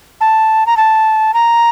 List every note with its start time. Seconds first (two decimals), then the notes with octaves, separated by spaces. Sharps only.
0.21 A5
0.66 A#5
0.77 A5
1.34 A#5